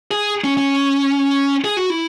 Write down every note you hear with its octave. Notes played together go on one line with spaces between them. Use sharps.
G#4
C#4
C#4
G#4
F#4
E4